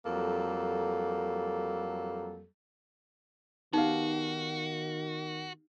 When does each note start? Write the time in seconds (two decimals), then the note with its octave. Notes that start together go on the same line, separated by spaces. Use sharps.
0.06 F2 F#3 G3 A#3 A4
3.73 D#3 B3 D#4 F#4 G4 F5